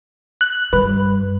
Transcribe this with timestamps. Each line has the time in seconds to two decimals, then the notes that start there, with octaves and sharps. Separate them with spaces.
0.41 F#6
0.73 G2 B4